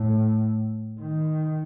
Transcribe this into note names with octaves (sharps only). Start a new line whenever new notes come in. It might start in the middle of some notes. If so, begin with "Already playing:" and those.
Already playing: A2
D#3